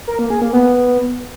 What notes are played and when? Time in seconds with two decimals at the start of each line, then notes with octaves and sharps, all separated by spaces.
0.07 A#4
0.19 A#3
0.30 G#4
0.42 A#3
0.53 B3